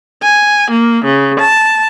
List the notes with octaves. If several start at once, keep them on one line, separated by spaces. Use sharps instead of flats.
G#5
A#3
C#3
A5